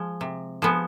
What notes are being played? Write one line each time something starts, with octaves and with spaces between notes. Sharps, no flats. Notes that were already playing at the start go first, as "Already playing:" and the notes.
Already playing: F3 G#3
C3
F3 G#3 B3